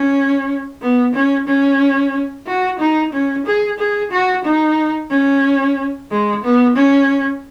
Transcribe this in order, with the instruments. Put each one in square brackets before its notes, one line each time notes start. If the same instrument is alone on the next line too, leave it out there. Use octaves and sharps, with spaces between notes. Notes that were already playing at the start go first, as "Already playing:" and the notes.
Already playing: [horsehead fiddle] C#4
B3
C#4
C#4
F#4
D#4
C#4
G#4
G#4
F#4
D#4
C#4
G#3
B3
C#4